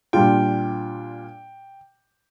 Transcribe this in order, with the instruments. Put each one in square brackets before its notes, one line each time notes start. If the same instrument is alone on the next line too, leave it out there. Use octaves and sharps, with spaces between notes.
[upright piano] A#2 G3 D4 F4 [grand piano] G5